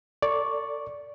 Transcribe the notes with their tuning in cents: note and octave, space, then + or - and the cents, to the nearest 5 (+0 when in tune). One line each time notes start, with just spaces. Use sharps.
A4 +45 D5 -10 C#6 -5